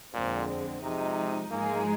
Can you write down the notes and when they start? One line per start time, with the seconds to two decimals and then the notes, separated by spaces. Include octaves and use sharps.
0.14 F2 A#2 D3 G#3 C4
0.82 C3 F3 G#3 D#4
1.51 G#2 F3 G#3 A#3 D#4 G#4